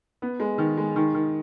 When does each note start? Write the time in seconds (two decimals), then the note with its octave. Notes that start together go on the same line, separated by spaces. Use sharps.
0.22 B3
0.40 G#3
0.58 D#3
0.77 G#3
0.96 D#3
1.14 D#3